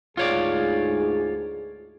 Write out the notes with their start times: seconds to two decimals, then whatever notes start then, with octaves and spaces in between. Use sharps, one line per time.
0.17 D2 G#2 F4 G#4 C#5 D5